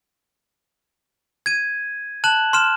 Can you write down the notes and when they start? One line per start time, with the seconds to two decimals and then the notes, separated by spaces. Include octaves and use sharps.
1.46 G#6 D#7
2.24 A5 F#6 E7 F#7
2.53 C6 F6 E7